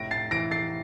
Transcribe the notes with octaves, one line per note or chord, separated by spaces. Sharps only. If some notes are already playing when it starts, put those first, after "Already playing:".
Already playing: F1 A2 A#6 D7
A6 C7
E3 A#6 D7
A6 C7